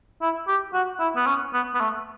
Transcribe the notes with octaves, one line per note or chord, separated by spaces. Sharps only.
E4
G4
F#4
E4
B3
C#4
B3
B3
A3